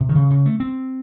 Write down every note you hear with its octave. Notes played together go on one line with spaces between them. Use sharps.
C3
D#3
C#3
C#3
A3
C4